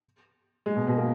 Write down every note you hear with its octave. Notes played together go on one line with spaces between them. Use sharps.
G#3
B2
B2
A#3